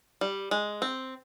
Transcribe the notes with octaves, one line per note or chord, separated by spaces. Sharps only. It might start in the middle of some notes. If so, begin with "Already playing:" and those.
G3
G#3
C4